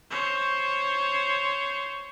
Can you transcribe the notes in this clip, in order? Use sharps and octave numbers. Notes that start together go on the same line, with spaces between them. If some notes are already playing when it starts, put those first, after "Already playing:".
C5 C#5